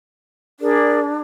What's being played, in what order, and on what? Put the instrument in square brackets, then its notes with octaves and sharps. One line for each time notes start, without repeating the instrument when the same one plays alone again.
[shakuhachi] D4 [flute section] G#4 A#4 D5